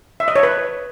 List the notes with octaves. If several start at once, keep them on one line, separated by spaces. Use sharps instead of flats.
E5
D#5
C#5
B4